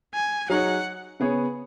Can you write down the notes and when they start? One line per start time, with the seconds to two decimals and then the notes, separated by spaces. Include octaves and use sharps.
0.14 G#5
0.50 F#3 D#4 G#4 C#5 F#5
1.20 C#3 B3 G#4 C#5